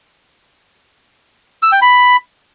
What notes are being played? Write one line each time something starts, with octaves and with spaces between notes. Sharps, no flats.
E6
G5
B5